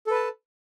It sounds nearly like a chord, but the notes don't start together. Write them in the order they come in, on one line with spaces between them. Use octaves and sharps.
A4 B4 A5